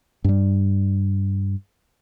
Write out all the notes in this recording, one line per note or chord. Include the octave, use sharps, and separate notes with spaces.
G2 G3